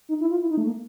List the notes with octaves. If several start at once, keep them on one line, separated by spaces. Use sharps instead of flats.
D#4
E4
F4
E4
D#4
A3
A#3